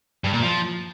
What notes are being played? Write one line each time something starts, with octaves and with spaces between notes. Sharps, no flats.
G2
A#2
F3